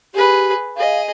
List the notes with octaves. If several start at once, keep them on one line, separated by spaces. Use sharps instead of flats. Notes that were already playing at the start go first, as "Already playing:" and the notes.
G4 G#4 B4
G#4 D#5 F5